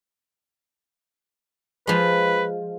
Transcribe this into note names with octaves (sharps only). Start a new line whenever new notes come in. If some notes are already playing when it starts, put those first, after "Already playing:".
F3 G#3 B4